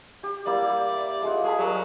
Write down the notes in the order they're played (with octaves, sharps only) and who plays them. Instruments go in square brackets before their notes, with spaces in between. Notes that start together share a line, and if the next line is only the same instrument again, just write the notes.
[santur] G4
[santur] G3 A#3 E4 [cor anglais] D5
[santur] G#3 F4 F#5
[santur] G#3 A5 B5 [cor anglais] G#4
[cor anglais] F#3 [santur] G3 A#4